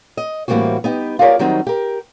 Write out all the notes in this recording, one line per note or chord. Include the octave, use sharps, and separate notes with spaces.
D#5
A2 E3 G3 A#3 C4 F#4
B3 D#4 G4
F4 G4 G#4 A#4 C#5 D5
D#3 F#3 G3 C4 D#4
G4 A#4